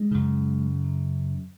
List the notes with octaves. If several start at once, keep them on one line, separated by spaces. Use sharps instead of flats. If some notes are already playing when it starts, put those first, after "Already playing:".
Already playing: G#3
F#2 C#3